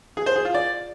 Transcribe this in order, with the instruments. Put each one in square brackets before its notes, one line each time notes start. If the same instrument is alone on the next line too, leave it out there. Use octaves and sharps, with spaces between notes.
[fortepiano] G#4
C5
G#4
F4
D5